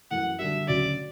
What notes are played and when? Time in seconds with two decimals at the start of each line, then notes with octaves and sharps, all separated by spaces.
0.11 F#2 E3 A3 F#5
0.39 D3 G3 D4 F#4 E5
0.68 D2 C#3 F#3 D5